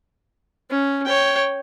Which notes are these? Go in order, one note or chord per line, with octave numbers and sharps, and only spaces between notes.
C#4
C#5 G5